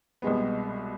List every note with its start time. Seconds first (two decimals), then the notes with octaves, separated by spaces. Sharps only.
0.22 C2 B2 G#3 B3